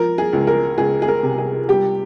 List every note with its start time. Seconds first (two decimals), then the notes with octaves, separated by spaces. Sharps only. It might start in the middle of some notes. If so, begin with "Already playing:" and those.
Already playing: F3 A#4
0.18 G#4
0.33 C#2
0.47 A#4
0.78 C#2 G#4
1.02 G#4
1.08 A#4
1.23 C3
1.38 G#4
1.69 G3 G4